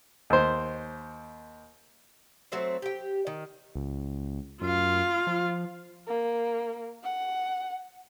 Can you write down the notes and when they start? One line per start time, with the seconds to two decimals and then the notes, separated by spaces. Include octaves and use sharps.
0.30 D#2 C5
2.52 F#3 A3 C4 C5
2.82 G4 G5
3.27 D#3
3.75 C#2
4.62 F#2 F4 F5
5.27 F3
6.08 A#3
7.03 F#5